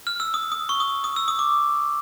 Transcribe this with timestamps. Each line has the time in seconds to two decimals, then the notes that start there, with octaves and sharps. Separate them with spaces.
0.07 F6
0.20 E6
0.34 D#6
0.52 D#6
0.69 C#6
0.80 D#6
1.04 D#6
1.16 E6
1.28 D#6
1.39 D6